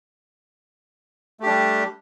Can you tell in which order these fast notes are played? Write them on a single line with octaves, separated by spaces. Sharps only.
A3 G4 D4 G3